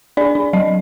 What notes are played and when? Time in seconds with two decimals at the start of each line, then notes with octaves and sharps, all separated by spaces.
0.17 D4 D5
0.35 D4
0.53 F#3 D#5